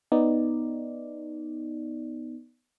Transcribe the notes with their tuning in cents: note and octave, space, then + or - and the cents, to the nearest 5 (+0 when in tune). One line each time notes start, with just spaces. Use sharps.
B3 +0 D#4 +0 D5 +0